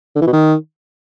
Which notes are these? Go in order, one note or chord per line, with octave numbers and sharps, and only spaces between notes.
D3
E3
B2
D#3